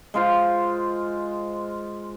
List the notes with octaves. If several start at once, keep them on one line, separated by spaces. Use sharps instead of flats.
G#3 F4 C5